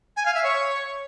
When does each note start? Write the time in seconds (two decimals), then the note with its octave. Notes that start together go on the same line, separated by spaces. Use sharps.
0.17 G#5
0.26 F5
0.35 E5
0.44 C#5